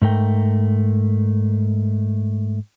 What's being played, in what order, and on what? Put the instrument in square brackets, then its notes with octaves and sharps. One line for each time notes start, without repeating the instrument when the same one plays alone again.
[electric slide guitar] G#2 A3 A#4 G5